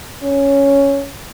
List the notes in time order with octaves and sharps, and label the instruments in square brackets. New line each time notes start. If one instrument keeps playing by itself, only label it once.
[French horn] C#4